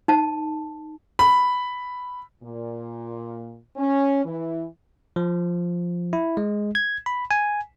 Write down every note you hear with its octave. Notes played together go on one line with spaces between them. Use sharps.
D#4 A5
B5
A#2
C#4
E3
F3
E4
G#3
G#6
B5
G#5